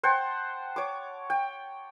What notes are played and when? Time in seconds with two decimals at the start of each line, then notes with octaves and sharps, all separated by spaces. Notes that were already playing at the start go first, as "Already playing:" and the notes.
0.03 C5 F#5 G5 A5
0.76 C#5 D6
1.30 G5